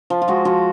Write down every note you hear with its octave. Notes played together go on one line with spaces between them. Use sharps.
F3
F4
G#3 F#4
F3 F#4